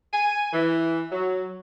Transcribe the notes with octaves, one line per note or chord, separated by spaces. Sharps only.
G#5
E3
F#3